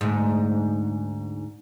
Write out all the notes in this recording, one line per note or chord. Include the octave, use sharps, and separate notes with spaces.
D2 G#2